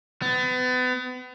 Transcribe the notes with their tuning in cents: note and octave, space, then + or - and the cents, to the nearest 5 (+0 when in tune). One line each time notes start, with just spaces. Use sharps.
B3 +35